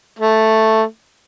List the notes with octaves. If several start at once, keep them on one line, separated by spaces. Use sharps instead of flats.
A3